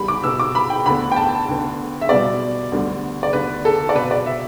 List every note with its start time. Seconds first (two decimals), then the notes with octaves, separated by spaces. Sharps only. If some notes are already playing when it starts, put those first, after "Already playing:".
Already playing: E2 G3 B5
0.08 D6
0.24 B2 B3 E6
0.39 D6
0.55 B5
0.70 G5
0.86 D2 D3 B3 B5
1.12 G5
1.16 A5
1.48 D2 D3 B3
2.01 E5
2.09 B2 G3 B3 D5
2.72 D2 D3 G3 B3
3.23 D5
3.33 D2 D3 B3 B4
3.65 A4
3.89 D5
3.95 B2 B3 B4
4.11 D5
4.26 E5